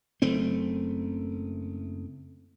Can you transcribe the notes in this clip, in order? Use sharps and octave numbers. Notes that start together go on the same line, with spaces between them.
F#1 A3 C4